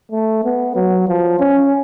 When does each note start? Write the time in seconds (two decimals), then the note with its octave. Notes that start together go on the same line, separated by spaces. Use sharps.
0.11 A3
0.44 B3
0.76 F#3
1.08 F3
1.39 C#4